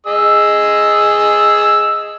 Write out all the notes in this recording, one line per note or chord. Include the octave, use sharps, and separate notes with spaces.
G#4 D#5 E6